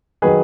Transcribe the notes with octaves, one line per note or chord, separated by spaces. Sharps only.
D#3 F#3 G#4 B4